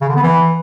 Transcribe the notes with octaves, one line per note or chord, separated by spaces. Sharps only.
C#3
D3
B3
E3